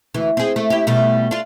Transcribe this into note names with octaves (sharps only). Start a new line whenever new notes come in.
D2 E3
C4 G#4
A3
E4 G4
B2 G3 A3
D4 F4